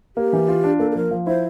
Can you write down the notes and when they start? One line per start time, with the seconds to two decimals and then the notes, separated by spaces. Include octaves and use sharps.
0.16 A#3 G4
0.33 E3
0.48 F4
0.64 D4
0.79 A#3 A4
0.91 A4
0.95 F3 A#4
1.11 F3
1.27 E4 C5